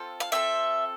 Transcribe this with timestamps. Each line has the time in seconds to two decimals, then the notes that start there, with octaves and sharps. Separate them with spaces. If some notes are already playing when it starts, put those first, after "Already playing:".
Already playing: C4 F4 A4
0.20 F5
0.32 C4 F4 A4 E5